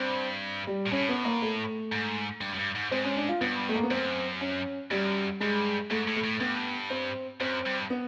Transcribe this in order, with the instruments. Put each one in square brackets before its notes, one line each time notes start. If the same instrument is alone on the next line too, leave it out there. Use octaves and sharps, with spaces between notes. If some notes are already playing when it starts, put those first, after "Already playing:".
Already playing: [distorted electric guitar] G2 [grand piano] C4
[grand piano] G3
[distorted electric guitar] A#2
[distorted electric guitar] A2 [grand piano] C#4
[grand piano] B3
A#3
A3
[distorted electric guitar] G#2
G2
F#2
G2
G#2
[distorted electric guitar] G#2 [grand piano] C4
[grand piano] C#4
D4
F4
[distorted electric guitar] G2 [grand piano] B3
[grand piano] A3
A#3
B3
[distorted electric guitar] F#2 [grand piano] C4
[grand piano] C#4
[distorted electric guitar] F#2 [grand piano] G3
[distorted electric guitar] G2 [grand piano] G#3
[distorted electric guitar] G#2 [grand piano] A3
[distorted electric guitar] A2
[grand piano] A3
[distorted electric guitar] A2
[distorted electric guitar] G2 [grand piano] B3
[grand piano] C4
[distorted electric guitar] F#2 [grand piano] C4
[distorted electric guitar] G2
[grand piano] B3